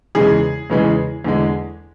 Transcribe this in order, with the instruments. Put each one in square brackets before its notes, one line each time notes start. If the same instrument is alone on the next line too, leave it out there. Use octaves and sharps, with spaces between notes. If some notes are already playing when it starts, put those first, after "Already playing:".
[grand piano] E2 C#3 E3 G#3 G#4
E2 C#3 E3 G#3
E2 D3 G#3